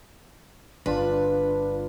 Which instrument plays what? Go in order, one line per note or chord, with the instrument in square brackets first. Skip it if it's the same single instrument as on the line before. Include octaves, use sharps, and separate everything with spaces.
[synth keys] G1 D4 F4 [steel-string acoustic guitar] B4